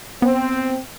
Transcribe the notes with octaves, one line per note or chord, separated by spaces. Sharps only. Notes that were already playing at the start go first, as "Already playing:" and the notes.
B3 C4